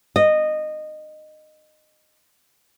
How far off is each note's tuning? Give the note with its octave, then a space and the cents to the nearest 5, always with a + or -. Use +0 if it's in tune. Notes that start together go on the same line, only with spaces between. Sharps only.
D#5 -15